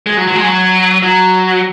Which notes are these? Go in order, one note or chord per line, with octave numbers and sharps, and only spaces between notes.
G#3
F#3
F#3
G#3
F#3
F#3